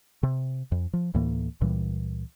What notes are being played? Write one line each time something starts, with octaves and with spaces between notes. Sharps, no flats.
C3
F2
F3
D2 A2 E3 A#3
C#2 A#2 E3 G3